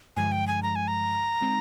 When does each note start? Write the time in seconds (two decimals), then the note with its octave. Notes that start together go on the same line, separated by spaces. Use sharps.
0.16 G2 D3 F3 G#3 G#5
0.32 G5
0.48 G#5
0.63 A#5
0.76 G#5
0.88 A#5
1.40 D3 G#3 C4 D#4